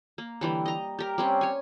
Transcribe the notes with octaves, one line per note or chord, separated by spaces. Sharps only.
A#3
D3 E3 G3
D#5 A#5
G4 A#4
G3 C4 C#4
C#5 G#5